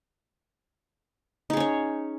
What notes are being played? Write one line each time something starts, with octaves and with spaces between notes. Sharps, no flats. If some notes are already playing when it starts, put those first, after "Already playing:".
C#4 D#4 G#4 C#5